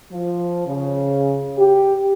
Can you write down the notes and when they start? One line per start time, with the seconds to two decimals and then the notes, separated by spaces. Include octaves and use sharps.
0.12 F3
0.67 C#3
1.58 G4